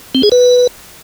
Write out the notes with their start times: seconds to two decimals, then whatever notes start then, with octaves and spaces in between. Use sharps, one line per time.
0.15 C4
0.23 G#4
0.32 B4